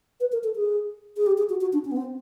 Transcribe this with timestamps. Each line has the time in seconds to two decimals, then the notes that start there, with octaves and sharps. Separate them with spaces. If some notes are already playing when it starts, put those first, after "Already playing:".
0.20 B4
0.32 A#4
0.44 A4
0.56 G#4
1.17 G#4
1.26 G4
1.38 G#4
1.49 F#4
1.61 F#4
1.73 D4
1.85 C#4
1.92 B3
1.97 C4